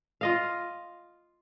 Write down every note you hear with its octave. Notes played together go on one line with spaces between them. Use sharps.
F4 D#5 F5